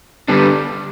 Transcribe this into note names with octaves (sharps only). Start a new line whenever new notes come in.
D3 G3 B3 D4